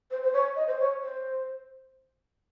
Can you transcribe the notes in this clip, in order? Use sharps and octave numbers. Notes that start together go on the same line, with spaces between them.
C5
C5
C#5
D#5
C5
C#5
C5